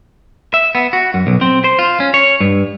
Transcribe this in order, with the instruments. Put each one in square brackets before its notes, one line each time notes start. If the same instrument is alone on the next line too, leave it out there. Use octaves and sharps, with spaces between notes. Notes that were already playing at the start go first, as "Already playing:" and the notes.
[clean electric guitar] E5
B3
F#4
F#2
B1
C4
C5
F4
C#4
C#5
G2